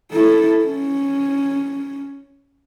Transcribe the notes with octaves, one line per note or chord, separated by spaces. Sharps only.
E4 A4
C#4